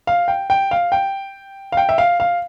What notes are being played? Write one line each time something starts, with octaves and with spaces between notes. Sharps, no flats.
F5
G5
G5
F5
G5
F5
G5
E5
F5
F5